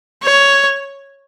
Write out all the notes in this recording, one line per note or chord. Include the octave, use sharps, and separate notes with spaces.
C#5